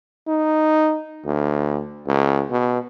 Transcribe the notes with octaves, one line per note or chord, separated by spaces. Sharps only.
D#4
D2
C#2
B2